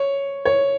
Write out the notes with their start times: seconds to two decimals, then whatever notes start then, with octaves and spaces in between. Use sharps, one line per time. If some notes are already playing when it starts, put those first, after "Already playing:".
Already playing: C#5
0.45 C#5